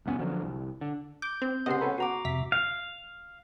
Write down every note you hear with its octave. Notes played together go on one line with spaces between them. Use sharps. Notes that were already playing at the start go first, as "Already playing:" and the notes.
C2 F2 B3 C#4
D3 F3 F#3
C2
D3
D6 G6
C4
C#2 C3 C5 D#5 F#5 C6
C#4 A4 B4
B3 F#4 A#5 D6
F2 C3 E5 B6
F5